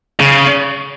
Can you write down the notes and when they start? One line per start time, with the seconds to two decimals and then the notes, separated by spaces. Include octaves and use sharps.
0.20 C#3